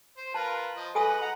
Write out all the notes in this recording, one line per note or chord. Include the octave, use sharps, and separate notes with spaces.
C5
F4 A#4 B4 A5
F3 D#5
F#4 A4 B4 D#5 G#5 D#6
F#5 A#5